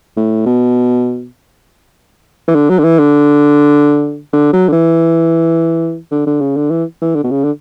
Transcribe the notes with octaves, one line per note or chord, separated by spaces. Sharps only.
A2
B2
E3
D3
F#3
D3
E3
D3
D3
F#3
D3
E3
D3
D3
C#3
D3
E3
E3
D3
B2
C#3
D3